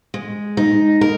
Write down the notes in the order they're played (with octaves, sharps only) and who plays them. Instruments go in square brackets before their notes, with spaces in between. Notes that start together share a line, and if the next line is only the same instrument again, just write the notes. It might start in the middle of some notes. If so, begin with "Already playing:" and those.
[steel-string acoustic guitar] G#3
D#4
A#4